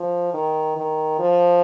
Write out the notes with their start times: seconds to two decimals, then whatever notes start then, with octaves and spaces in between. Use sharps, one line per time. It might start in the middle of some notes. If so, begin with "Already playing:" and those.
Already playing: F3
0.34 D#3
0.77 D#3
1.19 F3